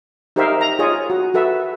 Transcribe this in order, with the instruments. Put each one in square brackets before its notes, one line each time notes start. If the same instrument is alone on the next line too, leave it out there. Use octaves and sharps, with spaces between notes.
[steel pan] D#4 G4 A#4 C5 E5 F5
A#5
F4 G#4 C#5 D#5
F#4
F#4 A4 B4 E5